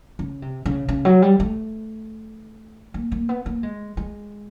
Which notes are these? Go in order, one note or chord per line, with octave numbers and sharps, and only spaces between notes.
C#3
C3
C#3
C#3
F#3
G3
A3
A#3
A#3
B3
A#3
G#3
G#3